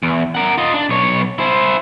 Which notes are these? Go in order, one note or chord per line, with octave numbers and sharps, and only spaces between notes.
E2
A#4 F#5
F4 D#5
D4
B1 C#5
E4 C5